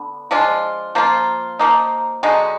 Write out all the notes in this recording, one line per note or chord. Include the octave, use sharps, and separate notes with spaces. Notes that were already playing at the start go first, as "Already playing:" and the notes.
Already playing: D3 B3
F3 G#3 D4 F4
F3 A#3 F4
F3 A#3 D#4
D3 G#3 D#4 F#4